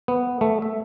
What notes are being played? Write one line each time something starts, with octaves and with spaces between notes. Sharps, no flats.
B3
A3
E5